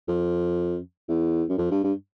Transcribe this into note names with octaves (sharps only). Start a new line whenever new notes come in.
F2
E2
F#2
F2
G2
G2